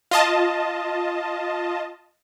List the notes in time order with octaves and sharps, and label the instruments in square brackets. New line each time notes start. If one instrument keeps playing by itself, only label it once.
[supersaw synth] F4 D#5 A5